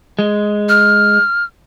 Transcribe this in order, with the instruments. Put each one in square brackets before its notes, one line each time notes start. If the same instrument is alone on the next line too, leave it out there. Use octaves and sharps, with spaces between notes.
[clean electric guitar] G#3
[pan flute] F6